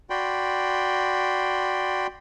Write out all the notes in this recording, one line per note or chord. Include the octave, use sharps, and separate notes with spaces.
F#4 D5 G5 B5 C6